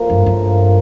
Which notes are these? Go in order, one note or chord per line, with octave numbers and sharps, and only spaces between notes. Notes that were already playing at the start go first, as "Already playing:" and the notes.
Already playing: A2 F3 A#3 F4 A#4
G2
G2